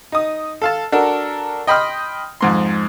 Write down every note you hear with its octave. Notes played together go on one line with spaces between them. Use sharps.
D#4 D#6
A4 F5 A5
D4 F#4 A4 A#4
D#5 G5 B5 C6 D#6 F6
F2 G#2 C6